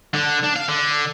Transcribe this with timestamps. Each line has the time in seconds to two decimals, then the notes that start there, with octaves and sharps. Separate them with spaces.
0.14 D3
0.43 D4
0.56 F5
0.68 D3